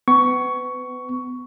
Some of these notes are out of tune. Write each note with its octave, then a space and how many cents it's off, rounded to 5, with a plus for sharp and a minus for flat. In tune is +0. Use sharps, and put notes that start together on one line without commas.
B3 +30 C#6 +10